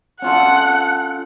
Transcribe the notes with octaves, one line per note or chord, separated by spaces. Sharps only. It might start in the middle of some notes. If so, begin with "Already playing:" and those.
C#4 F4 A4 F#5